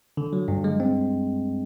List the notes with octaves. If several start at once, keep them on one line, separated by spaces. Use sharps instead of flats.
D3
F#3
G2
G#3
C4